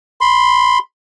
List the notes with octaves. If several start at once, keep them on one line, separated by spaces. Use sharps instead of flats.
B5 C6